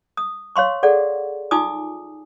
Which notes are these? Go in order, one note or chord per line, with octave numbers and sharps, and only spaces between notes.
D#6
C#5 F5 C6 C#6
G#4 A4 D5 F#5
D#4 F4 G#5 D6 D#6